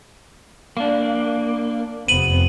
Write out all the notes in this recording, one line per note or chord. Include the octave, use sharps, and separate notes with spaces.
A#3 D4
F1 B3 C4 D#7 F#7